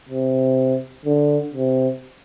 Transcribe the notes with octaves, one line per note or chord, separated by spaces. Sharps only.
C3
D3
C3